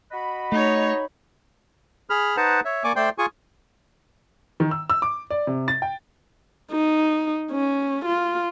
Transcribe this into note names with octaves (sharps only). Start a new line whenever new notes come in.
F#4 D#5 B5
A3 D#4 C#5
G#4 B5 F6
D#4 B4 C5 F#5 A5 A#5
C#5 E5
A#3 D5 G#5 C#6 D6
A3 C5 D5 G5 C6
F4 G#4 G#5 C#6
D#3
E6
E6
D6
D5
C3
A6
G5
D#4
C#4
F4